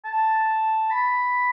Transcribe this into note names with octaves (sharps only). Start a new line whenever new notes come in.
A5
B5